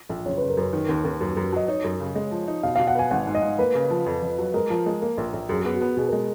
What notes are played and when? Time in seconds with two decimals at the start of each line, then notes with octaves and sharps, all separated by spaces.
0.09 A#1
0.25 F#1 C#5
0.37 B4
0.41 F#1
0.49 A#4
0.57 F#2 B4
0.73 D#3
0.89 D#2
1.05 D#2
1.21 F#2
1.37 F#2
1.52 F#3 D#5
1.68 D#4 C#5
1.84 F#2
2.00 C#3
2.15 G#3
2.31 F3
2.48 D#4
2.63 B2 F5
2.76 F5
2.79 B2
2.87 F#5
2.95 B4 G#5
3.11 G#1 F#5
3.27 G#2
3.35 D#5
3.43 G#2
3.59 A#3 B4
3.75 C#3
3.90 F3
4.06 F2
4.23 F2
4.38 F#3
4.54 G#3 A#4
4.70 F3
4.86 G#3
5.02 A#3
5.17 A#1
5.33 A#1
5.49 F#2 G#4
5.61 B3 G#4
5.74 F#4
5.81 B3
5.97 B2 G#4
6.09 G#3 A#4